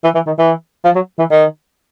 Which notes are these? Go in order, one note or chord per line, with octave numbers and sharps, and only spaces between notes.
E3
E3
D#3
E3
F3
F#3
E3
D#3